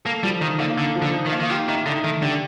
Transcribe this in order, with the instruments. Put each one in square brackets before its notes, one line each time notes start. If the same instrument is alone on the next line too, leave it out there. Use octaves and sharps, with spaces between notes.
[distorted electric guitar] A#3 [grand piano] A4
[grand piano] F3 [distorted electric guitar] G3
[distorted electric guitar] D#3 [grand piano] D#4
[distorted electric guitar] D3 [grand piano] A#3
[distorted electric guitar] D3 [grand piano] A4
[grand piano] F3
[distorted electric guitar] D3
[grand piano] D#4
[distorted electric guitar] D#3
[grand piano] A#3
[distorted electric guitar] D#3
[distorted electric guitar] F3 [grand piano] G4
[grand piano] A2 [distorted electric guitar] D#3
[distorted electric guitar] D3 [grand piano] D#4
[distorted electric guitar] D#3 [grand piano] A3
[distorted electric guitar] D3 [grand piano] G4